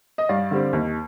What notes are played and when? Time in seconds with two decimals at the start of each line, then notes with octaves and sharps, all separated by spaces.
0.18 D#5
0.29 G2 D5 F5
0.51 D3 G3 C4
0.73 D#2